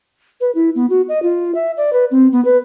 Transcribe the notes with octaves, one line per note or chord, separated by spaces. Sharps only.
B4
E4
B3
F#4
D#5
F4
E5
D5
B4
C4
B3
B4